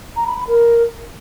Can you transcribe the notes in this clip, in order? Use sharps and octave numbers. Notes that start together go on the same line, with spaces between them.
A#5
B5
B5
A#4